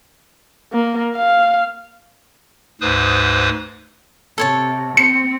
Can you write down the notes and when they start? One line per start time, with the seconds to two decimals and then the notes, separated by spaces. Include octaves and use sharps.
0.73 A#3
1.16 F5
2.81 D2 G#2 B4 C5 D#6
4.38 C3 A4 C#5 A5
4.97 C4 C#7